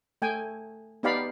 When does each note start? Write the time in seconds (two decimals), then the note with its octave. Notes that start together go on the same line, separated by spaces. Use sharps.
0.22 A3 G5 G#5
1.03 B3 D#4 G4 D5 F5 B5